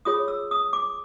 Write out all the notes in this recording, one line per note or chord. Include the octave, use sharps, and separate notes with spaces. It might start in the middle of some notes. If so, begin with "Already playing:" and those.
F4 G#4 C#5 D#6
E6
D#6
D6